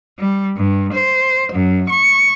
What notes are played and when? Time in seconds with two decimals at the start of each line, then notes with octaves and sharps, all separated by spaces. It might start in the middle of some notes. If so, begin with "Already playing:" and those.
0.19 G3
0.57 G2
0.92 C5
1.52 F#2
1.89 C#6